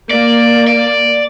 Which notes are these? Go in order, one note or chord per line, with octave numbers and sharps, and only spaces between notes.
A#3 D5
D5